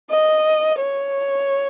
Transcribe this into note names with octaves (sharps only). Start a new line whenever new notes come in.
D#5
C#5